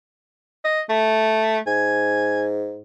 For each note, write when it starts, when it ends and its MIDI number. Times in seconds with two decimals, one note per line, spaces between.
0.64 0.81 75
0.89 1.58 57
1.67 2.83 44
1.67 2.43 80